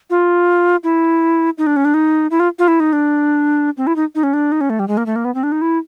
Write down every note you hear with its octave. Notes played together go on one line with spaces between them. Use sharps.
F4
E4
D#4
D4
C#4
D4
D#4
E4
F4
F4
E4
D#4
D4
C4
E4
D#4
D#4
C#4
D4
D#4
C#4
A3
G3
G#3
A#3
A3
A#3
B3
C4
D4
D#4
E4